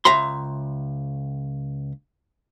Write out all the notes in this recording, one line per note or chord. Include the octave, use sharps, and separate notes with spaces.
C#2 E5 A#5 C6